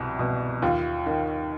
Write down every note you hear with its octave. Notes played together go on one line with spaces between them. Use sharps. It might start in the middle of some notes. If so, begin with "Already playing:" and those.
Already playing: C2 B2
B2
D#2 F4
D#3